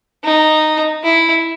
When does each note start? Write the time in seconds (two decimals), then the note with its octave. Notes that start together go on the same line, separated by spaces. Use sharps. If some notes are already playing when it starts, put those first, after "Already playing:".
0.24 D#4
1.03 E4